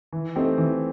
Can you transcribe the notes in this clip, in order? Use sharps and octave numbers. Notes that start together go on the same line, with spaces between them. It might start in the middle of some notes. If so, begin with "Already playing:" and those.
E3
A3 C4 D#4 G4
E3